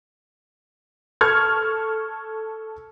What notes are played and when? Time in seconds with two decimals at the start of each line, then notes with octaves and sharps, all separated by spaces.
1.21 A4 C#6 F6 G#6